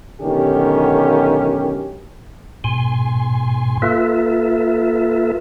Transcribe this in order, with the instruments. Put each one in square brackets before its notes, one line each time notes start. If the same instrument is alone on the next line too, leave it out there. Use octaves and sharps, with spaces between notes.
[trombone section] B1 D3 D#3 C#4 G4
[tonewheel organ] G#2 B2 G#5 C6
A#3 F4 A4 B4 E5